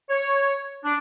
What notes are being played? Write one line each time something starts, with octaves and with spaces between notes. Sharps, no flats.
C#5
D4